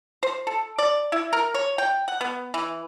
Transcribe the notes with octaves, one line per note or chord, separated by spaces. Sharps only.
C5
A4
D5
E4
A#4
C#5
G5
F#5
B3
E3